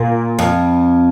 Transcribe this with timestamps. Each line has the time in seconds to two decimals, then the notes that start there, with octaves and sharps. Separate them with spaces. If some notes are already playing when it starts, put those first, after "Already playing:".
Already playing: A#2
0.39 F2